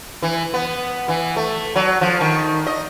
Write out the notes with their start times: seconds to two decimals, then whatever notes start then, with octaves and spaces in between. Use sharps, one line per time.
0.23 E3
0.54 B3
1.08 E3
1.37 A3
1.76 F#3
2.01 F3
2.21 D#3
2.67 D#5